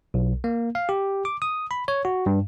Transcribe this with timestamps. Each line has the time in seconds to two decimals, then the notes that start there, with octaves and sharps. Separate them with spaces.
0.14 B1
0.44 A#3
0.75 F5
0.89 G4
1.25 D6
1.42 D#6
1.71 B5
1.88 C#5
2.05 F#4
2.26 G2